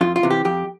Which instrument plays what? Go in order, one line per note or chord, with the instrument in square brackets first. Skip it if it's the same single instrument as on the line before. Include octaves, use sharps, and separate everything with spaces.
[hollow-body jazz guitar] F2 F4
F4
C3 E3
G4
F2 G4